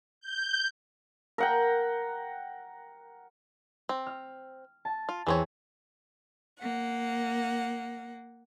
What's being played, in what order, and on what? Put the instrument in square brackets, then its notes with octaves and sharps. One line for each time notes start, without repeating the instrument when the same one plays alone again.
[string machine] G6
[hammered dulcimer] A#4 F#5 G5
[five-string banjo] C4
[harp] F6
A5
[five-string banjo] F4
[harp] E2 [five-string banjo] E3 C4 C#5
[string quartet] A#3 F#5